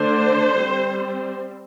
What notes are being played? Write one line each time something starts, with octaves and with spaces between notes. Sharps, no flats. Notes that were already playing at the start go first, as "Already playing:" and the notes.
Already playing: D3 A3 D4 C5
G3 C4